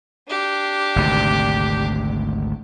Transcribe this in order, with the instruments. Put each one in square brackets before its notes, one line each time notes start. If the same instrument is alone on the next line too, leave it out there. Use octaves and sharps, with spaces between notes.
[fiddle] D4 G4
[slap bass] G#1 D2 C3